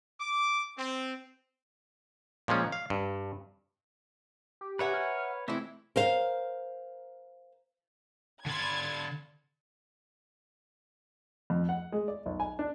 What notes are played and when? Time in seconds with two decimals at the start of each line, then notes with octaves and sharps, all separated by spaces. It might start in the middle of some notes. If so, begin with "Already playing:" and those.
0.19 D6
0.76 C4
2.48 A#2 F3 G#3 C#4
2.72 F5
2.90 G2
4.61 G4
4.79 A#4 B4 C#5 E5 F#5 G#5
4.94 F6
5.48 E3 G#3 A3 C4 E4 E5
5.96 A#4 C5 F5
8.46 D3 B5 C6 G#6 A6
11.50 F2
11.69 F#5
11.92 G#3
12.08 D5
12.26 B1
12.40 G#5
12.59 D4